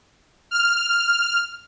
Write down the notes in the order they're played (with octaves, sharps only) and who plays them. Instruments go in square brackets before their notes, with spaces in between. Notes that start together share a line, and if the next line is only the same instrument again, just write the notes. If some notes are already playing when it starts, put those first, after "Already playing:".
[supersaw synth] F6